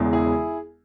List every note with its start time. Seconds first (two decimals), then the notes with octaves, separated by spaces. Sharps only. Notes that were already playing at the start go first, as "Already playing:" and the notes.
Already playing: E1 E2 C#3 E3 G#3
0.13 E4 G#4